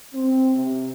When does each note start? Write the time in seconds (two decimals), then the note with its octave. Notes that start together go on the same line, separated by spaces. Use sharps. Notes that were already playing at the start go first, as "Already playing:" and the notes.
0.14 C4
0.55 C3